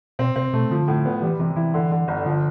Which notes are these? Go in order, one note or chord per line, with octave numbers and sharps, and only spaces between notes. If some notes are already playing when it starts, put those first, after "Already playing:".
B2 C4
C3 C4
B2 A3
D3 F3
A2
B3
E3 G3
C3 E3
E3 E4
D3
D3
G1
D3 F3